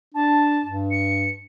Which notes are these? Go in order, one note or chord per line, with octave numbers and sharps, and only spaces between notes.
D4 A5
G2
C#7